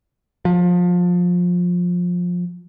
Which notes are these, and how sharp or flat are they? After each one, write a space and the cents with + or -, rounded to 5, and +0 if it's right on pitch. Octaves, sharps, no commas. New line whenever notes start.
F3 +20